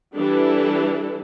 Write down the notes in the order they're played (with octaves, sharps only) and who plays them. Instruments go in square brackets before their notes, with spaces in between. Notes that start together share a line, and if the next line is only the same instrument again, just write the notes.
[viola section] E3 G3 D4 A4